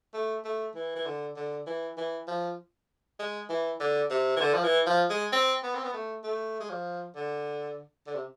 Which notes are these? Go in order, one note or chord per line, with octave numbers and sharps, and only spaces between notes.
A3
A3
E3
E3
D3
D3
E3
E3
F3
G#3
E3
D3
C3
E3
D3
F3
E3
F3
G#3
C4
B3
C4
B3
A3
A3
G#3
F3
D3
D3
C3